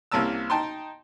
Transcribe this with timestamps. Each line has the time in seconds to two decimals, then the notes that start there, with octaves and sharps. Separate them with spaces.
0.12 C2 C3 A#3 C#4 A5 E6
0.50 D#4 G5 A5 C6